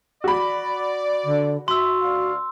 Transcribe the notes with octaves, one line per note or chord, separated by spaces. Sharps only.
F#4 D5 B5
D3
F#4 E5 C6 E6
D2 D5 F5